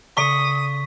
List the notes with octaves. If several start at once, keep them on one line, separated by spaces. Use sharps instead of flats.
C#3 A4 D5 C#6 D#6 B6